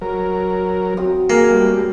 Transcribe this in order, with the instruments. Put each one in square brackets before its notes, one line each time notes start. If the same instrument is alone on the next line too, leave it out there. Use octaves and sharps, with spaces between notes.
[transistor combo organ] F#3 A#4
[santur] F#3 C4 D#6
[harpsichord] A#3 [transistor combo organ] G#4
[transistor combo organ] G3 A3